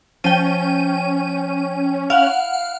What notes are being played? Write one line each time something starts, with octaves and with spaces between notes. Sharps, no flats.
F3 C#4 G5 D#7
E4 F5 F#5